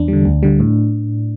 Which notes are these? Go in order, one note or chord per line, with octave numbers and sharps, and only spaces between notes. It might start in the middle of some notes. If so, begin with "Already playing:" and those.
Already playing: E2 D4
D3 G3
D2
D3 G3
A2